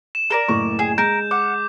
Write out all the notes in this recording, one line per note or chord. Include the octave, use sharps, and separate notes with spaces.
E7
A4 A#4 D5
F#1 A2 C#6
G#4
G#3 A#4 G6
F#5 D6